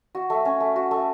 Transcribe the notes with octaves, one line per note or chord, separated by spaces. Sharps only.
F#4
A3
C#4
A3
F#4
A3